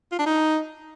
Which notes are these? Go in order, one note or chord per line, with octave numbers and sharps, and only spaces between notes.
F4
D4
D#4